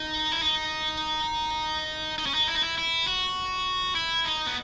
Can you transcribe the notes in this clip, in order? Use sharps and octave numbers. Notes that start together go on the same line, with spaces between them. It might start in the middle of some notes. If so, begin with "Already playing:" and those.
Already playing: D#4
E4
D#4
D#4
C#4
D#4
E4
D#4
E4
E4
F#4
E4
D#4
B3